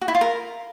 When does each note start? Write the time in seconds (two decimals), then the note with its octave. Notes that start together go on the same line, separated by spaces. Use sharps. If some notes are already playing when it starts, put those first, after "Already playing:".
0.01 F#4
0.08 E4
0.15 F4
0.21 A#4